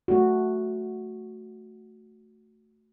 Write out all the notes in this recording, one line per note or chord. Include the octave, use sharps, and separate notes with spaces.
A3 F#4